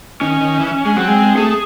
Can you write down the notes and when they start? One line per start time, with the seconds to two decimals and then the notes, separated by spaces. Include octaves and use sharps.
0.21 D#3 C#4
0.41 D#3
0.60 E3
0.85 G#3
0.96 F#3 C4
1.08 G#3
1.36 A3 G#4